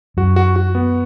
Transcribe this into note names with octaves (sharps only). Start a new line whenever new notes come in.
F#2 F#4
F#4
F#4
B3